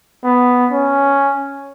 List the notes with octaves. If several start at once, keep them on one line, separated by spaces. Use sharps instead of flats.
B3
C#4